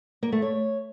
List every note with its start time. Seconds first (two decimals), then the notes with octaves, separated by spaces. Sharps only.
0.23 A#3
0.32 A3
0.42 C#5